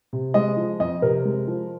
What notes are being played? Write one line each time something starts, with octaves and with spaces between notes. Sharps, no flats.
C3
G#3 D#5
F3
F2 D#5
C3 A#4
G#3
F3